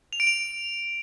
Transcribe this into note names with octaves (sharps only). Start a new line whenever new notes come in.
F7
D7
F7